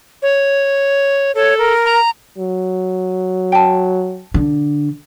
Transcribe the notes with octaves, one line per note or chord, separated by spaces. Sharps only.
C#5
A4 C#5
A#4
A#5
F#3
G5 A5
D3